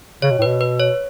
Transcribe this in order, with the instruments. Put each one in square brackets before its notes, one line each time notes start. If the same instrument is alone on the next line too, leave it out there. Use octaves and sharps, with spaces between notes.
[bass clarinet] C#3 [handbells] C#5
[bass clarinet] B2
A2
[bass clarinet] B2 [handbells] B4
[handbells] B4
C#5